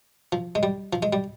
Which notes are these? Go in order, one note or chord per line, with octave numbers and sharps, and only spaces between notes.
F3
G#3
G3
F3
G#3
G3